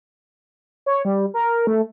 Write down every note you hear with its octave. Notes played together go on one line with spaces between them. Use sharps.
C#5
G3
A#4
A3